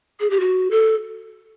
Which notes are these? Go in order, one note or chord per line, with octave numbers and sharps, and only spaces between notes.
G#4
G4
F#4
A4